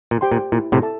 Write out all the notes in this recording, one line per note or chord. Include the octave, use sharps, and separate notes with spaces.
A#2
G4 C5 G5 C6
A#2
A#2 E4
A2 C3
A4 E5 A5